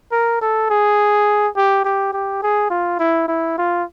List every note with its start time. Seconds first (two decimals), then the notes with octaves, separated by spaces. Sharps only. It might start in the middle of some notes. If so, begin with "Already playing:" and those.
0.12 A#4
0.42 A4
0.70 G#4
1.57 G4
1.85 G4
2.13 G4
2.42 G#4
2.70 F4
3.00 E4
3.28 E4
3.58 F4